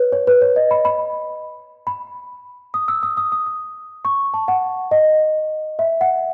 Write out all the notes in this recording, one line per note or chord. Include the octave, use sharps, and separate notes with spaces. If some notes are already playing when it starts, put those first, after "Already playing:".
Already playing: B4 C#5
C#5
B4
C#5
D#5
B5
B5
B5
D#6
E6
D#6
D#6
D#6
D#6
C#6
A5
F#5
D#5
E5
F#5